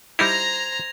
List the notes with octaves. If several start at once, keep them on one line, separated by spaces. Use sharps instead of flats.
G3 D#4 E4 C5 A#5 G#6 A#6 F7